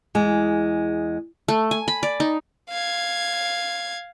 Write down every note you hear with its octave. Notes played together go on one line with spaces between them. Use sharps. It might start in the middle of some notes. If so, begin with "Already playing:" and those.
E2 G#3
A3
G#5
B5
D5
D#4
F5 G#6